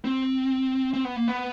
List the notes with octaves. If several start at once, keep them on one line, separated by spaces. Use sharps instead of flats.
C4
C4
B3
A#3
B3